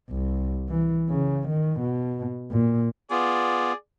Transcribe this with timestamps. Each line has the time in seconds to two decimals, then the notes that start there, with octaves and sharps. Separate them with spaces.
0.11 C2
0.69 E3
1.10 C#3
1.49 D#3
1.80 B2
2.51 A#2
3.11 B3 F4 G#4 D5